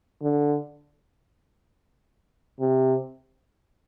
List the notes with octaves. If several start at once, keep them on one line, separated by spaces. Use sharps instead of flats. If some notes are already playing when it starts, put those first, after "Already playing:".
D3
C3